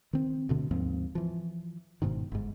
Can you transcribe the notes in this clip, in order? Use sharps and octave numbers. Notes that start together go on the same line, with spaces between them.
D#3 C4
D2 B2 D3
D#2 G#2 F3 C4
E3 F3
G1 G#2 B2 D#3
G1 G#2